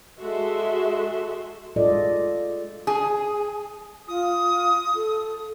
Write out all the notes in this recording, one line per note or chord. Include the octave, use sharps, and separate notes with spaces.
G#3 F#4 A4 E5 C6
G#3 F4 A4 D5 D#5
G#4
F4 D#6
A4